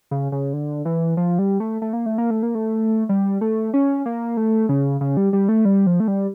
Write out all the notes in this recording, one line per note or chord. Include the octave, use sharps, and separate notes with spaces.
C#3
C#3
D3
E3
F3
G3
A3
A3
A#3
A3
A#3
A3
A#3
A3
G3
A3
C#4
A#3
A3
C#3
C#3
G3
G3
A3
G3
F3
A3
G3